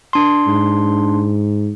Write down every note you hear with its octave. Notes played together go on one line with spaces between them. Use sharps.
D4 C6
G#2